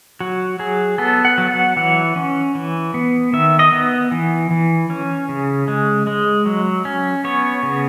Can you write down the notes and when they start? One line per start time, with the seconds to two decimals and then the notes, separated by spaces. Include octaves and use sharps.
0.21 F#3 F#4
0.59 F#3 G#4
0.98 B3 A4
1.25 F#5
1.38 F#3
1.51 F#5
1.77 E3 F#5
2.16 C#4
2.55 E3
2.94 B3
3.33 D#3 E5
3.59 D#5
3.72 B3
4.11 E3
4.51 E3
4.90 C#4
5.29 C#3
5.68 G#3
6.07 G#3
6.46 F#3
6.85 C#4
7.24 B3 C#5
7.63 C#3